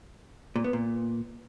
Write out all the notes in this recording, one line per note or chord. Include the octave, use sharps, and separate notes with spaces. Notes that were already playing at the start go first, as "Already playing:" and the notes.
A#2
B3
A#2